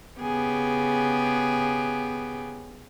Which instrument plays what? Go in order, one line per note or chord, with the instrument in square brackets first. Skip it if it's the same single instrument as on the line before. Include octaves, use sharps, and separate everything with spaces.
[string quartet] C#3 B3 G4 G#4